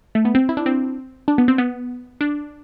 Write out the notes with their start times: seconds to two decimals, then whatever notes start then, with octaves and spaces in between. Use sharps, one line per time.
0.15 A3
0.25 B3
0.35 C4
0.49 E4
0.57 D4
0.66 C4
1.28 D4
1.38 B3
1.48 C4
1.58 B3
2.21 D4